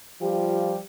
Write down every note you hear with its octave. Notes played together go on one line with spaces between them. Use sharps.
F3 G3 F4 G4